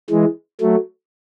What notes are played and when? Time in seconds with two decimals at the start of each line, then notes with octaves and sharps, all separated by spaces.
0.10 E3 G#3
0.60 F#3 A3